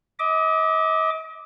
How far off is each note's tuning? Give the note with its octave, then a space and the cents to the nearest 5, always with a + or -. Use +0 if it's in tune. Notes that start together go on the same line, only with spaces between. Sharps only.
D#5 +40 D6 +10